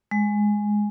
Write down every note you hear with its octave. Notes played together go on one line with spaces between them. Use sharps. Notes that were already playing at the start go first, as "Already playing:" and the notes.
G#3